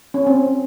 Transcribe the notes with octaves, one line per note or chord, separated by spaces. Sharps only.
C#4
C4